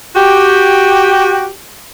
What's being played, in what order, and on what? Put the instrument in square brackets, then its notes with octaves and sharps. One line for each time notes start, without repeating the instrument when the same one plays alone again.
[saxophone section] F#4 G4